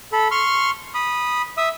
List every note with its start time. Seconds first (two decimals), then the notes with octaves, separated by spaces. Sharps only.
0.13 A4 B5
0.31 C6 C#6 F6
0.94 B5 D#6
1.57 E5 D#6 E6